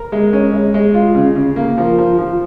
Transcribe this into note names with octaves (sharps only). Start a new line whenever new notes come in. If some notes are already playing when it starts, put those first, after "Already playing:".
Already playing: A#4
G#3
C#4
G#3
G#3
F4
C#3
C#3
A#3
F3
F3
F3